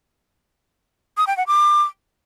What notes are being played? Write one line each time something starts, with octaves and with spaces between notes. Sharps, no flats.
D#6
G5
F#5
D6